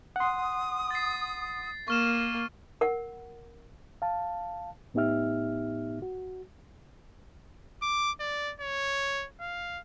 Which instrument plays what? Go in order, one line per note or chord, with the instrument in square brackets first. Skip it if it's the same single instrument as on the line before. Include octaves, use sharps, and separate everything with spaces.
[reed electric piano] F#5 C6 [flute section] D#6
[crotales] A6 C7
[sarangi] A#3 [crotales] C#6 F6 E7
[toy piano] A#4 F#5
[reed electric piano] F5 A5
A2 B3 D#4 G4 E5 F6
F#4
[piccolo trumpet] D6
D5
C#5
F5